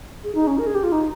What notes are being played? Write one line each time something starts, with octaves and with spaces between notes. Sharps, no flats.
G#4
D#4
C#4
A#4
G#4
G4
F4
D#4